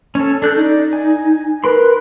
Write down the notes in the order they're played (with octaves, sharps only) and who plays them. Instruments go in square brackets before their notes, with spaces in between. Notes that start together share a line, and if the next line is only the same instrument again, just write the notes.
[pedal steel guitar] C#4 A4
[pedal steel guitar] D4 F#6 G6 [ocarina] A4
[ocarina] D#4 [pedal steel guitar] D5
[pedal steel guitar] G#5
[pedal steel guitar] A#4 B5 C6 [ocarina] B4